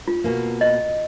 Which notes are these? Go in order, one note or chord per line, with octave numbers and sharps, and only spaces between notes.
F4
B2 A#3
D#5